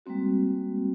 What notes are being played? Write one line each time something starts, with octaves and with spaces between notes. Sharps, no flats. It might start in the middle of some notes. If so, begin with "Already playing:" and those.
G3 G#3 A#3 C4 F#4